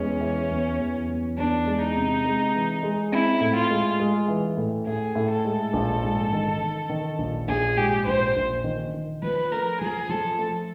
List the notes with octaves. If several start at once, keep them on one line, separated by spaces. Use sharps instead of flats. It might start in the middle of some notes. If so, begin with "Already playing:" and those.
Already playing: E2 G#3 C#4
E3
E2
E2
E2
E2 D4
G#3
D#4
C3
G#3
E3
G#3
C4 E4
A2
F4
G#3
G#3
E3
A2
A2 G#4
A2
A4
G#3
A#1
G#2
D#3
D#3
D#3
A#1
A#1 G#4
G#2 G4
A#1 C5
A#1
D#3
D#3
F3 B4
A3 A#4
F3 G#4
F3 A4
A3